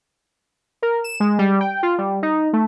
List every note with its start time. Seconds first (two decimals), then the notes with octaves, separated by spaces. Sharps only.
0.82 A#4
1.04 E7
1.20 G#3
1.39 G3
1.60 G5
1.83 F4
1.98 G3
2.23 D#4
2.53 A3